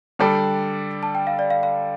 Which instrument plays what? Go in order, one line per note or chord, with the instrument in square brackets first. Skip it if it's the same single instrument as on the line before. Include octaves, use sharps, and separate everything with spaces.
[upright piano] D3 G3 D4 A4 D5 [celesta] G5
[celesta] A5
G5
F5
D5
F5
F5